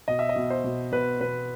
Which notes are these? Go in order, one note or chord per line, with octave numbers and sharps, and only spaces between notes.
B2 D#5
E5
D#5
B2
C5
B2
B2 B4
B2 B4